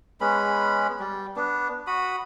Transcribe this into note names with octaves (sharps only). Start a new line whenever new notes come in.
G#3 B3 C#4 B5
G3
B3 D4
F#4 B5 D#6